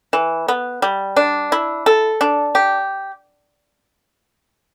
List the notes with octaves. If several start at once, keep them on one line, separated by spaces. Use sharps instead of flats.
E3
B3
G3
D4
E4
A4
D4
G4